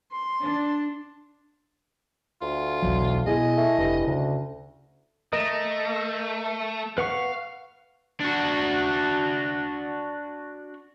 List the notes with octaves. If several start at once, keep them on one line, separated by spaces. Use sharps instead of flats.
C6
D4
D2 F4
B1 E2 F#3
B2 E4 G#4 D#5
A3
F1 G2
D2 C#3
A3 A#4 D#5
B4 F5 F#5 C#6
D4 F#4